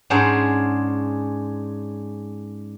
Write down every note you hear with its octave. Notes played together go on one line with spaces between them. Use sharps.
G#2 C#4 D4 G#4 C5 F#5